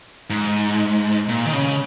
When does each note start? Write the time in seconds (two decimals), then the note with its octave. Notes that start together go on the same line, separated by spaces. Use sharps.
0.30 G#2
1.29 A#2
1.45 D#3
1.53 C#3